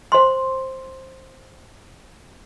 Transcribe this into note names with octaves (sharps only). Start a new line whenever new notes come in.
C5 C6